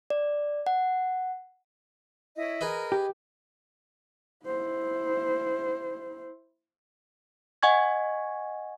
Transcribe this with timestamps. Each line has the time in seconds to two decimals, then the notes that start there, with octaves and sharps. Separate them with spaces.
0.10 D5
0.67 F#5
2.37 E4 C#5 D#5
2.61 G#4 A#4 B4 D#5
2.92 G4
4.46 E4 C5
7.63 D#5 F#5 G#5 C#6 G#6